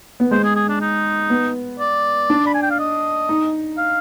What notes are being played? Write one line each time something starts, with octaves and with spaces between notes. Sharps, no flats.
B3
G#3 C5
G#4
G#4
D4
D#4
B3
D5
D4
B5
G#5
G5
F5
D#5
D#4
F5